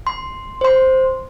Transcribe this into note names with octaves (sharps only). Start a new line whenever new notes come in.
C6
C5 C6